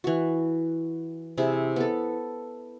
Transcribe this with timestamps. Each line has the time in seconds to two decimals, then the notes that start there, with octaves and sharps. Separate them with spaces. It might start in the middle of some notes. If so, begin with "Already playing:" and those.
0.04 E3 F#4
1.38 C3 E4 G#4
1.76 B3 A4